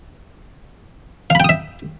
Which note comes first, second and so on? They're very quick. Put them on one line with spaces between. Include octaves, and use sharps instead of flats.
F5 B5 G5 D#6 E5